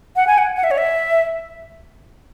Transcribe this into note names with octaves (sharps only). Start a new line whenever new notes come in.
F#5
G#5
F#5
F#5
E5
C#5
E5